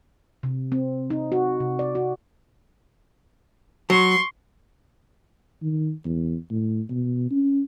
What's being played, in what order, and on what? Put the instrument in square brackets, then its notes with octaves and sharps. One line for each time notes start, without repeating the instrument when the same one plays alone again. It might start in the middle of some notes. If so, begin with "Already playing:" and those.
[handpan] C3
C4
D#4
F#4
C3
D5
F#4
[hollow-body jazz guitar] F#3 [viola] C6 C#6
[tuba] D#3
E2
A2
B2
C#4